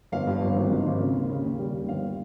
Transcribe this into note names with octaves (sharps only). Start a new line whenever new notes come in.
G1 F5
G2
G1
G#1
G#2
G#1
C#3
D#2
C#3
D#2
G3
D#2
G1 F5